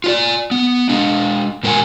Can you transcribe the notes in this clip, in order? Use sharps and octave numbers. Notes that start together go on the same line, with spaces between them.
F4 C#5 D5
B3
G#3 D4
A#2 G#3 A#4 B4 F#5 G#5